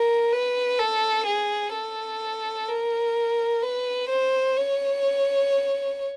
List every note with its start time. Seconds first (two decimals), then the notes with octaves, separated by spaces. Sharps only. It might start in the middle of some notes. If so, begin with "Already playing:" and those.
Already playing: A#4
0.33 B4
0.79 A4
1.26 G#4
1.73 A4
2.68 A#4
3.63 B4
4.09 C5
4.57 C#5